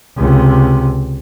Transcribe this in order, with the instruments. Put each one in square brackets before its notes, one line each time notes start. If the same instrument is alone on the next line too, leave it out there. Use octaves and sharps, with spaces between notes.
[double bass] C#2 C3